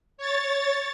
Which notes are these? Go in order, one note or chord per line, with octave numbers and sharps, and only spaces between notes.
C#5 A6